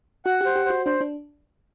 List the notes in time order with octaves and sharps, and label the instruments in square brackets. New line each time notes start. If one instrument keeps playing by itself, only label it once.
[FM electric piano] F#4 [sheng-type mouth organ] F#5
[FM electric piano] G4 [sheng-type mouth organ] C5
[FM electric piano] G4
[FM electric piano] F#4 [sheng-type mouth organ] C5
[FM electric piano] D4 [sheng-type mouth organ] C5
[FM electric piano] D4